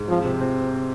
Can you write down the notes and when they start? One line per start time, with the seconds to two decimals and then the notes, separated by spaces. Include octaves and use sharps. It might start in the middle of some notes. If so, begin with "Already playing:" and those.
Already playing: G#2
0.09 F3 C4
0.24 C3
0.41 C4